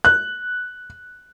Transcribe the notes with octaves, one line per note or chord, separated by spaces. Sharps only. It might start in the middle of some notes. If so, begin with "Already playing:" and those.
F#6